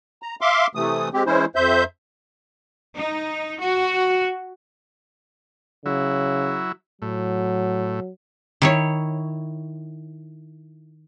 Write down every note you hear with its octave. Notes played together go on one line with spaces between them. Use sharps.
A#5
E5 F5 C6 D6
C3 E3 A3 D#6
G#3 C4 G4
E3 G#3 C#4 E4 C5
F2 C5 E5 G6
D#4
F#4
C#3 F#3 E4
A2 F#3
D#3 E4 C#5